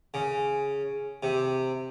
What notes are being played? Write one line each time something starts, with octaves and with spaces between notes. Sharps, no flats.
C#3
C3